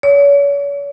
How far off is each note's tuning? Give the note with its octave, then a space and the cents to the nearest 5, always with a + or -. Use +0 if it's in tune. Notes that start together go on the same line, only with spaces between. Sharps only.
C#5 +40